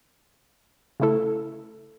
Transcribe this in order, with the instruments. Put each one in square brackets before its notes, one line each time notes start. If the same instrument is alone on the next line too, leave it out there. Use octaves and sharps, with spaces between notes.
[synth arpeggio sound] C#3 A3 E4 A4